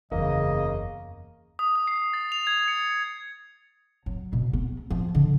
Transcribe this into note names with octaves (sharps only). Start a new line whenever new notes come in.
F#1 E2 C#3 A#3 D#5
D#6
D#6
C7
A6
F7
G#6
C#7
F#3
B2
B3
F3
D3